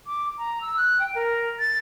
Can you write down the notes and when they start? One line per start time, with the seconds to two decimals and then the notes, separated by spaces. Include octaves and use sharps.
0.06 D6
0.38 A#5
0.61 E6
0.77 F#6
0.99 G5
1.15 A#4
1.59 A6